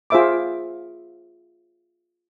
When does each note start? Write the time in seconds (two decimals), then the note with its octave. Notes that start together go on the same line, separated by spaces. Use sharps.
0.10 F4 G#4 C5 E5 B5 D6